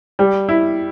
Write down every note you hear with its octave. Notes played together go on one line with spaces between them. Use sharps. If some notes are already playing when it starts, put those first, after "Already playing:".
G3
E4